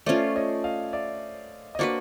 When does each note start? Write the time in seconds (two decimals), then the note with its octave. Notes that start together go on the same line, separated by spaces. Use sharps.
0.06 A3 C#4 F4 C5 D5
0.35 C#5 D#5
0.64 D#5 F5
0.93 D5 E5
1.75 D#5
1.79 A#3 D4 F#4 B4 C5 D5